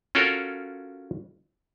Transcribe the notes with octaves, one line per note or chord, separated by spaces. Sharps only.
C#4 F4 F#4 A4 A#4 C#5